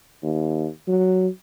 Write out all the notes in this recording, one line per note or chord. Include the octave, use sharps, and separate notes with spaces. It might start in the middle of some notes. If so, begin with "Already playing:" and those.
D#2
F#3